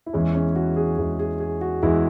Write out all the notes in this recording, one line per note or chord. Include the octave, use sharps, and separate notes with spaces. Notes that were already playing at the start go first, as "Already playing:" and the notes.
E4
E2 E3 G#3 C#4
C#4
F#4
G#4
E2 E3 G#3 F#4
G#4
G#4
F#4
E2 E3 G#3 E4